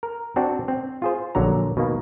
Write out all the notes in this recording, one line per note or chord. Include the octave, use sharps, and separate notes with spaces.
A#4
C4 D4 F#4
C4
F4 G#4 C5
A#1 D3 F#3 A#5
B2 D#3 A#3